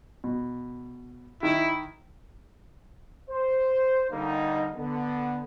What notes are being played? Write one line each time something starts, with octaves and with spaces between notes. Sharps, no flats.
B2
D#3 D#4 E4
C5
D3 G3 A#3 D#4
D3 B3